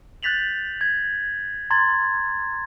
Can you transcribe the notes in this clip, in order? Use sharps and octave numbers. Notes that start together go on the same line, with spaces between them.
F#6 G6 A6 B6 F7 F#7
G#6
A#5 C6 G#6 A6